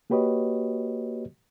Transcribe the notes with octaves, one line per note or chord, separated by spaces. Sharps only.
A#3 F#4 G4 B4 C#5 D#5